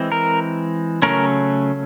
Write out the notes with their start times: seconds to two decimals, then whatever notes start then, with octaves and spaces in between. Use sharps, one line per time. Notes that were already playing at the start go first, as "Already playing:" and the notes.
Already playing: E3 G#3 C4
0.12 A#4
1.02 C#3 F#3 A3 C#4 A#4